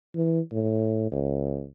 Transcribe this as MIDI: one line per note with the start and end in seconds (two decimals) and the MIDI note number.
0.15 0.40 52
0.52 1.09 45
1.12 1.67 37